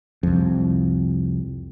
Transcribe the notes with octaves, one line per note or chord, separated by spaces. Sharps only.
C2 F2